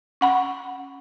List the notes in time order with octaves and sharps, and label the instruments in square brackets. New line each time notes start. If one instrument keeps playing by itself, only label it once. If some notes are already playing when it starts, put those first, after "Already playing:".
[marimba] C#4 F#5 B5